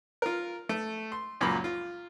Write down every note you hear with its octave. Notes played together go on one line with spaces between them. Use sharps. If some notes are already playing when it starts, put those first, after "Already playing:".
F4 A#4
A3
C6
C#2 F#2 A#2 A#3 B5
F4